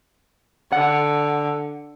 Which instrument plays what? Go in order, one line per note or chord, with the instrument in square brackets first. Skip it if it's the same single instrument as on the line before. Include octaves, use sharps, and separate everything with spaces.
[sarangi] D3 [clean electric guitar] F#5